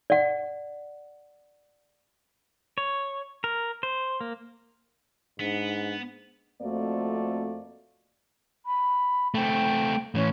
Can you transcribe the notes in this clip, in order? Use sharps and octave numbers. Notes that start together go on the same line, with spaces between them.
D5 F#5
C#5
A#4
C5
A#3
G#2 B3 D4
F2 A3 A#3 C4 F#4 D5
B5
A3 C4 G5
A2 E3 C#4